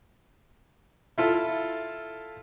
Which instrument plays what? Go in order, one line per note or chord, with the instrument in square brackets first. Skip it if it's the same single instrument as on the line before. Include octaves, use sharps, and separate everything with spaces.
[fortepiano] E4 F4 A4